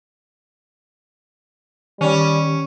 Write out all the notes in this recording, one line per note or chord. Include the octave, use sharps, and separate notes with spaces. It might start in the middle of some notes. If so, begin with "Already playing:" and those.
D#3 G3 C#4